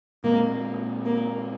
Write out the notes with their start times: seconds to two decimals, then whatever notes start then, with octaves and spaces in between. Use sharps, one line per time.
0.24 A#2 G#3 A#3 C4
1.05 A#3